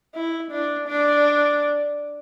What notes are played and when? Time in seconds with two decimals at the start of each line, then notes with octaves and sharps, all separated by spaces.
0.15 E4
0.51 D4
0.88 D4